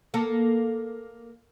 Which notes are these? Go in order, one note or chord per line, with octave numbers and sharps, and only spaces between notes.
A#3 A4